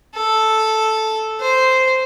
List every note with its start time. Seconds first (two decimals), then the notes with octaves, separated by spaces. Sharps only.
0.15 A4
1.41 C5